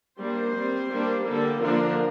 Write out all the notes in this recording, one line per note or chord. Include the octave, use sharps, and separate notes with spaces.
G3 A#3 D4 C5
G3 C4
G3 A#3 D4
D3 G3 A#3 A4
D3 F3 A#3 D4 A#4